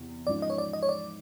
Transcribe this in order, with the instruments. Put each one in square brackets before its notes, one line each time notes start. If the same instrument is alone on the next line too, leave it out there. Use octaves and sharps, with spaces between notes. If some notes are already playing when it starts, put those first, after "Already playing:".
Already playing: [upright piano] E2 C3
[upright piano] G#2 F3 G#3 C#4 F4 [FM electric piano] D5
[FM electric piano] D#5
C#5
D5
D#5
C#5
D5